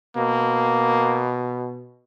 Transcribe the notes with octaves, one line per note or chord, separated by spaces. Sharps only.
B2 A#3